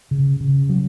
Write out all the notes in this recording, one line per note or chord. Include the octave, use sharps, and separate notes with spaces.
C#3
C#3
F#3